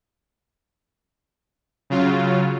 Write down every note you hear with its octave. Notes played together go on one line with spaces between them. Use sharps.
C#3 F#3 F4